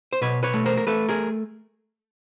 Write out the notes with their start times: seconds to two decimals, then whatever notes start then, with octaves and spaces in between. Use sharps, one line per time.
0.13 C5
0.22 B2 B4 C#5
0.43 B4 C#5
0.54 A3
0.66 A#4 C5
0.77 A#4
0.87 A3 A4 B4
1.09 G#4 A#4